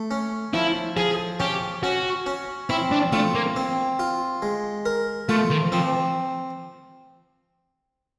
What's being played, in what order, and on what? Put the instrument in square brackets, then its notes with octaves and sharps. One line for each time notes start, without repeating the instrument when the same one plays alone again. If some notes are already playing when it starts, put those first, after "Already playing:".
Already playing: [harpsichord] A3
C#4
[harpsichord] F3 [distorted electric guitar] E4
[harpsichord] F3 [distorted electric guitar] G#4
[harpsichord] C#4 [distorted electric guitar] G4
[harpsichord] C#4 [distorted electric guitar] F#4
[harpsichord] C#4
[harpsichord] C4 [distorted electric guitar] E4
[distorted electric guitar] D4
[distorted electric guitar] A3 [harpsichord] F4
[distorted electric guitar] A#3
[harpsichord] C4
F4
G#3
A#4
[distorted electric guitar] A3 [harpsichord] F4
[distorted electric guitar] D#3
[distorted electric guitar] F3 [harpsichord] C4